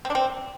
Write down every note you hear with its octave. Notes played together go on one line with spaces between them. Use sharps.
C4
D4
C4